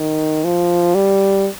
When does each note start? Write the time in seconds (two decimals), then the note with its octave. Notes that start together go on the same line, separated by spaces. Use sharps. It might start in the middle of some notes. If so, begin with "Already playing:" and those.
Already playing: D#3
0.44 F3
0.95 G3